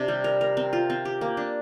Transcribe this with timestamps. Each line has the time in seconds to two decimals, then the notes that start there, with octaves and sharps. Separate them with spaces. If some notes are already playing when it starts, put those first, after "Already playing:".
Already playing: C3 D4
0.08 G3
0.24 A#4
0.41 A#4
0.57 C4
0.73 F4
0.90 C4
1.05 G4
1.21 A#3
1.37 D4